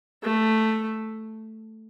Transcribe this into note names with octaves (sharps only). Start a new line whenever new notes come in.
A3